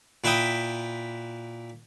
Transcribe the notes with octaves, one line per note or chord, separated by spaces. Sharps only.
A#2 E4 B4 E5 G5 D#6